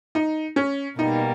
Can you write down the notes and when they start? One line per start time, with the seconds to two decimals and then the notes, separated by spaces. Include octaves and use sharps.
0.15 D#4
0.56 C#4
0.98 B2 G3 A#3 D#4